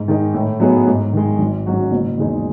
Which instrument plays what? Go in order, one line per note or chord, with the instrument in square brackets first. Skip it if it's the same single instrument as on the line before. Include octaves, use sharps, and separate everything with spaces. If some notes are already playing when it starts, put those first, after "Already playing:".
Already playing: [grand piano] G#2
D#3 G#3 D#4
A2
F#3 B3 D#4 G#4
G#2
D#3 G#3
G#1
G#2 F#3 C#4 F#4
F#1
E2 D#3 G#3 D#4